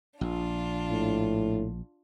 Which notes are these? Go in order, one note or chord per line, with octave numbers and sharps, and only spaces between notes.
A#1 D4 F4
A2